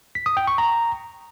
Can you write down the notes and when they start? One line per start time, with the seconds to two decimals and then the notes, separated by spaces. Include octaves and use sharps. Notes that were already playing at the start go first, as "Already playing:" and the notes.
0.15 B6
0.26 D#6
0.37 G5
0.47 C#6
0.58 A#5